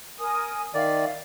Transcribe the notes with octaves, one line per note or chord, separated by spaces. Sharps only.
A#4 G#5 D#6
D#3 D5 E5 F5